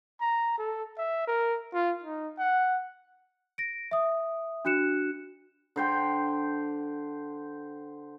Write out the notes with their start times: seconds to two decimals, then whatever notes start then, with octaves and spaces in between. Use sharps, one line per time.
0.21 A#5
0.58 A4
0.98 E5
1.28 A#4
1.74 F4
2.04 D#4
2.38 F#5
3.58 A#6 D7
3.91 E5 D#6
4.65 D4 F#4 F#6 C#7 E7
5.76 D3 C5 G5